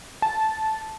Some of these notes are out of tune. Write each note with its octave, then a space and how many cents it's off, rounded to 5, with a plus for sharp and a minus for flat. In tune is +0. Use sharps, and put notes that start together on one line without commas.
A5 -10